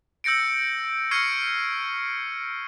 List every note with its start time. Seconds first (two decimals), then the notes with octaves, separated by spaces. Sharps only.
0.24 E6 G6 A#6 C#7 D7
1.11 C#6 F6 G#6 C7 C#7 D#7